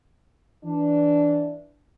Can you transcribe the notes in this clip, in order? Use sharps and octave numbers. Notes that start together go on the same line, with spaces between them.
E3 D4